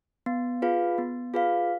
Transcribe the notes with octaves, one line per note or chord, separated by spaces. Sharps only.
B3
F4 G#4 B4 F5
B3
F4 G#4 B4 F5